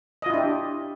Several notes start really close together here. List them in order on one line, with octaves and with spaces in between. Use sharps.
D#5 F4 E4 D4 G4